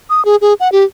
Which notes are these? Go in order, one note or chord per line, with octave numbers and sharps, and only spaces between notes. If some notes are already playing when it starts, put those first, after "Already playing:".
D#6
G#4
G#4
F#5
G4